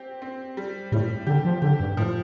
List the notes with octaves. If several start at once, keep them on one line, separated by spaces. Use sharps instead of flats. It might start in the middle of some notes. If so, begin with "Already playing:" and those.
Already playing: C4 G4
C4
G3
A2 G3
D3 G4
F3
D3 G4
G2
A2 F3